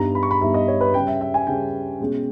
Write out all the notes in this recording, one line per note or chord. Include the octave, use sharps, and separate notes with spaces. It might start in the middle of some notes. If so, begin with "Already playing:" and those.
Already playing: G2 G3 B3 D#4 A#5
B5
C#6
B5
G2 G3 B3 D#4 E5
D#5
C#5
B4
C#3 G3 C#4 G5
E5
E5
G#5
C#3 G3 C#4 G5
B2 G#3 C#4